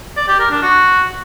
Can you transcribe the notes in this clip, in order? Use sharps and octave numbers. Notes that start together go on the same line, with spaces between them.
D5
G4
A#4
D4
F#4